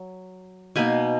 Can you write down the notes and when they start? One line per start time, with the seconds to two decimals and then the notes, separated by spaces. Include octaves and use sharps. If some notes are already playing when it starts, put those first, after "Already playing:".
Already playing: F#3
0.76 B2 A#3 D#4 G#5 B5